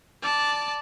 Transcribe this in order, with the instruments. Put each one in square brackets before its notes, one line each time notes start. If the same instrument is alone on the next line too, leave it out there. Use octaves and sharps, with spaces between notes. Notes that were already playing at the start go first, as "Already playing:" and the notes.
[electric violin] D5 A5